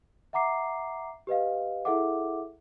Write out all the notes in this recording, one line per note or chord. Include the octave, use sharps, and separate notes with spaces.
E5 F#5 A#5 D6 C7
G4 B4 D#5 F5
E4 G#4 A4 E5 F#5 D6